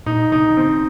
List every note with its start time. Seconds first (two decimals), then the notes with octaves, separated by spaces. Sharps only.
0.06 A#2 D#4
0.32 C3 D#4
0.50 C3
0.57 D3 C4